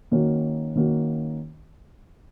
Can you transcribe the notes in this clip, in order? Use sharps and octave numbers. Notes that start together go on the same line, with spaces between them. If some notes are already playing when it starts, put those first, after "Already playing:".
D#3 A#3 C#4 F#4
D#3 A#3 C#4 F#4